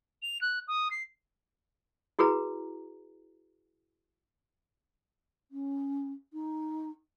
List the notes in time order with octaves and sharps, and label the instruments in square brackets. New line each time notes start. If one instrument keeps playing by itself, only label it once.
[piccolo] F7
F#6
D#6
C7
[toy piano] E4 F#4 G#4 B4 A#5
[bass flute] C#4
D#4